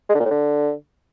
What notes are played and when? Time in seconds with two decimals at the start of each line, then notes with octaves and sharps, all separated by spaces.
0.09 G#3
0.15 D3
0.20 A#2
0.25 A2
0.31 D3